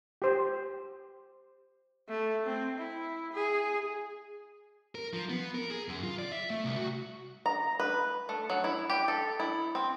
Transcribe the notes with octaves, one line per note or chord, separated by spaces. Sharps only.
G4 C5
A3
C4
E4
G#4
A#4
F3
B3
A#4
G#4
F#2
F4
D5
E5
A3
C2
F#4
A#5
B4
A3
F#3
E4
G4
A4
E4
C4